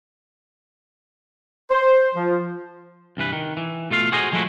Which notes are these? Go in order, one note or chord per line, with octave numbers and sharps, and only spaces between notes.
C5
F3
C2 G2 E3 B4
D#3
E3
B2 A3 F4 F5
F#4 G#4 C5 D#5
D3 F3 G#3 A3 E4 F#4